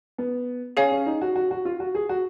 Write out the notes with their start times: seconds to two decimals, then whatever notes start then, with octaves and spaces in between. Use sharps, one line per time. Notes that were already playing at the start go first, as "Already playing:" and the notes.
0.18 B3
0.77 C#4 G#4 C#5 F5 G#5
0.92 C#4
1.06 D#4
1.22 F#4
1.36 F#4
1.51 F#4
1.65 F4
1.80 F#4
1.95 G#4
2.09 F#4